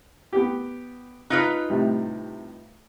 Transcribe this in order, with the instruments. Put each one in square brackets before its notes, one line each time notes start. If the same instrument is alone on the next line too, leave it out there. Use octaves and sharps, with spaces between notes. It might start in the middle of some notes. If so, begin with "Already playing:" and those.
[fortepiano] B3 G4
[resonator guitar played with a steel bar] D#4 F4 B4 [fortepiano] F#6
[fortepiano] A2 C3 G3